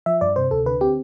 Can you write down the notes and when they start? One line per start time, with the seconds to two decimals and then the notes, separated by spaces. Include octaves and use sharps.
0.06 F3 E5
0.21 G2 D5
0.36 C3 C5
0.51 D2 A4
0.66 D3 B4
0.81 C4 G4